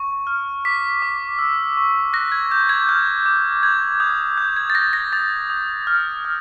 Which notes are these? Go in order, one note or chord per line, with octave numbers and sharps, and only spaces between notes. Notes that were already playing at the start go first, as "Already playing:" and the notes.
Already playing: C#6
F6
D6 B6
D6
E6
C#6
F#6 A#6
G#6
D6 G6
G#6
F6 G6
D6
G6 G#6
D#6 G6
D6 G6
G#6
A6
F#6 A#6
A#6
D#6 A6
D#6
F6
F6